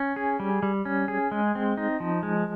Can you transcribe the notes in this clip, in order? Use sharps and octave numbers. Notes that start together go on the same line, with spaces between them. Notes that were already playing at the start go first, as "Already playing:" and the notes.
Already playing: C#4
G#4
G3
G3
C#4
G#4
G#3
C4
D#4
F3
G#3